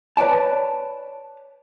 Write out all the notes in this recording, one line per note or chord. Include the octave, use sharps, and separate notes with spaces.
B4 C#5 D5 A5